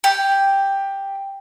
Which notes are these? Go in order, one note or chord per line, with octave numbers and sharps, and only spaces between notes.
G4